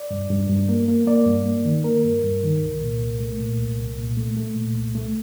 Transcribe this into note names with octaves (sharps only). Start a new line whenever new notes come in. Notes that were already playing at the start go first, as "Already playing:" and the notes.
Already playing: D5
G2
G2
G2
A#3
A#3
A#3 D5
G2
A#3
D#3
A#3 A#4
G2
G2
D#3
C2
A#2
C2
A3
A#2
C2
C2
A#2
A3
A3
A#2
C2
A3